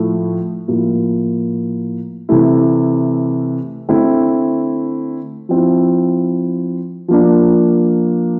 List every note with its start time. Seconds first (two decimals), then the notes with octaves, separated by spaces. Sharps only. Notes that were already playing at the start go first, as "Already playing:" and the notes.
Already playing: A2 F3 A3 E4
0.68 A2 F3 A#3 E4
2.29 C3 E3 A3 E4
3.89 D3 A3 C4 E4
5.49 F3 C4 E4
7.08 F3 A#3 D4